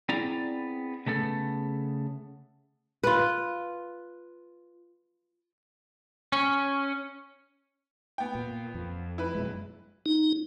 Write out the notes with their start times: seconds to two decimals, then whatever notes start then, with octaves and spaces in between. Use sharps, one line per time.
0.09 B3 C4 E4 G#4 D5 A#5
1.07 C#3 A3 B3 A4
3.04 F4 B4
6.32 C#4
8.18 B3 G5
8.35 A#2
8.75 F2
9.18 E4 B4
9.35 F#2 B2 G#3
10.06 D#4